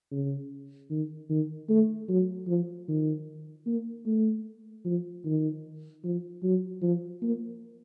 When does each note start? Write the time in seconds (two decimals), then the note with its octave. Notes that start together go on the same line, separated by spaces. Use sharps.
0.11 C#3
0.90 D#3
1.30 D#3
1.69 A3
2.08 F#3
2.48 F3
2.88 D#3
3.66 A#3
4.06 A3
4.85 F3
5.25 D#3
6.04 F3
6.43 F#3
6.82 F3
7.22 A#3